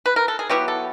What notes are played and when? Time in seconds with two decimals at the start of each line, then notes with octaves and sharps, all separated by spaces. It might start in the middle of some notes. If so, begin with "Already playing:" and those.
0.06 B4
0.16 A#4
0.28 A4
0.39 G#4
0.49 F#3 B3 E4 G4
0.68 A4